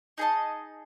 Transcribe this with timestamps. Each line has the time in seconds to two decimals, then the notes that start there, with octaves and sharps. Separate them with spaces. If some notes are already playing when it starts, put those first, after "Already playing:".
0.18 D#4 G#4 D#5 A5